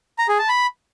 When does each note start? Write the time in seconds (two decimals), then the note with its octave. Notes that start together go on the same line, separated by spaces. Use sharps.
0.18 A#5
0.29 G#4
0.39 A5
0.49 B5